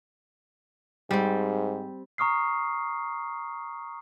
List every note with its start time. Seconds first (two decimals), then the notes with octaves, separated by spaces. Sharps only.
1.11 G#2 G3 C4
2.18 A#5 C#6 D#6 F6 C7